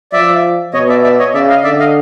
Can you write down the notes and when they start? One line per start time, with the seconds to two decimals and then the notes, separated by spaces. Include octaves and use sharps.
0.13 F3 D5 E5
0.73 B2 C#5 D#5
0.89 D5 E5
1.03 D5 E5
1.19 C#5 D#5
1.34 C#3 D5 E5
1.49 D#5 F5
1.64 D3 D5 E5
1.80 D#5 F5